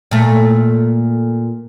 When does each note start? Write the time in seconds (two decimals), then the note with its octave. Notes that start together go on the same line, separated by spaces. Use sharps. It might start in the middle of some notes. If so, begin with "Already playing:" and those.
0.11 A#2 A3